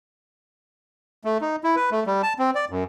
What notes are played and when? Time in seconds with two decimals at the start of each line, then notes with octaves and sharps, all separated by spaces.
1.25 A3
1.41 D#4
1.64 E4
1.76 B4
1.91 A3
2.07 G3
2.23 A5
2.39 C4
2.55 D5
2.70 F#2